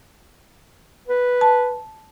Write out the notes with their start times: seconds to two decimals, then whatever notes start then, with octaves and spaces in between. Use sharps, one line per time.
1.07 B4
1.41 A5